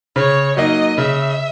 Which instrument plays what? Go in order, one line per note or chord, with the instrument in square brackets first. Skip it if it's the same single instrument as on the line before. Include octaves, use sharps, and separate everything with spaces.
[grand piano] C#3 [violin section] C#5
[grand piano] F#3 A#3 D#4 [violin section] D#5
[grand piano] C#3 [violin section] E5